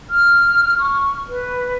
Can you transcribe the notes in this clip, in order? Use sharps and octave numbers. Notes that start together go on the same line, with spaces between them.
F6
C#6
B4